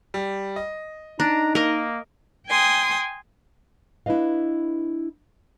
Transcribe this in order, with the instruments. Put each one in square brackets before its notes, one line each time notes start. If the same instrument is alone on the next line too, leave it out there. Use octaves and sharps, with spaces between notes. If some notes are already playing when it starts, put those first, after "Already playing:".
[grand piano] G3
D#5
[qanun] D4 [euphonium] D#4 [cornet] A#5
[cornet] A#3 [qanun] A#4 D#5
[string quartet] G5 G#5 C6 D#6
[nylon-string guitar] D4 E4 F4 B4 D#5 F5